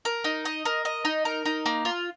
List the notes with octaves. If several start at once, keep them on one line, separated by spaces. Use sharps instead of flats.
A#4
D#4
D#5
A#4
D#5
D#4
A#4
D#4
A#3
F4